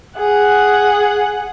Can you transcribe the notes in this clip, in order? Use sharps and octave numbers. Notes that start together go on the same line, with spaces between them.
G#4 F#5